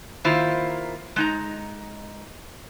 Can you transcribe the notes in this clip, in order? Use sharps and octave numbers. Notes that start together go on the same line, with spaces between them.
D#3 A#3 E4 F4 C5
G#3 D#4 A#5